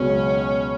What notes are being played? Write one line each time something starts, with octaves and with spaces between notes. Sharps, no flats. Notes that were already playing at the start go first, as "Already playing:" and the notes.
Already playing: C#2 B2 F#3 B3 C#4